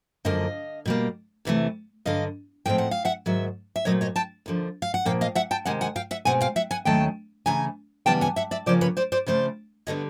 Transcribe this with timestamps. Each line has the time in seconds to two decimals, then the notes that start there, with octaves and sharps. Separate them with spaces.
0.25 F#2 D3 F3 A#3 D#5 F5
0.86 B2 G3 A#3
1.45 E2 C3 E3 A3
2.05 G2 D3 F#3 D#5 F5
2.66 A2 F3 G#3 C4 G5
2.78 F#5
2.91 F5
3.05 E5 F#5
3.26 G#2 D#3 F#3 E5
3.76 E5
3.85 A#2 F#3 A3 C4 C#5 D#5
4.01 C#5 D#5
4.16 G5 A5
4.46 D#2 D3 F3
4.82 F5
4.94 F#5
5.05 A#2 F3 A#3 F5 G5
5.21 D#5 F5
5.35 E5 F#5
5.51 G5 A5
5.65 C3 D#3 G#3 F#5 G#5
5.81 F#5 G#5
5.96 F5 G5
6.11 E5 F#5
6.25 B2 G#3 C4 F#5 G#5
6.41 F5 G5
6.56 E5 F#5
6.71 F#5 G#5
6.85 D#2 D#3 F#3 A3 C#4 G5 A5
7.46 C#3 E3 A3 G#5 A#5
8.06 C#3 E3 G3 B3 G5 A5
8.21 F#5 G#5
8.36 E5 F#5
8.51 D5 E5
8.66 C#3 F3 A#3 C#4 C5 D5
8.81 B4 C#5
8.97 C5 D5
9.12 C5 D5
9.26 C#3 F3 A3 C4 C5 D5
9.87 D3 G3 B3 C#5 D#5